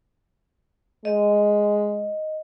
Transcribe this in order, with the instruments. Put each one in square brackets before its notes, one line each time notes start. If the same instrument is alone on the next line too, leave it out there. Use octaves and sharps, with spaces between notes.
[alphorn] G#3 [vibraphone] D#5